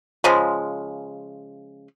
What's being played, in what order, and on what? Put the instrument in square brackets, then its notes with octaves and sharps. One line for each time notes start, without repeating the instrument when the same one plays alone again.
[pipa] C#3 F3 G#3